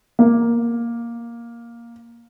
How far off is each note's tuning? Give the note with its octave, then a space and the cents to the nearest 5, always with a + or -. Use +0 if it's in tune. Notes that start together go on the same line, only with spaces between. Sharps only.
A#3 +5